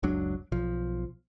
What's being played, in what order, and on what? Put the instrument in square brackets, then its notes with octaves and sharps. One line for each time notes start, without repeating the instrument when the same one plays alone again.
[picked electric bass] F#1 C#2 F#3 D4
B1 F3